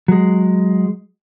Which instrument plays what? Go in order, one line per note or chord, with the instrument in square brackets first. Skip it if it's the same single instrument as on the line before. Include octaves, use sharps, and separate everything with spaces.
[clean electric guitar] F#3 G#3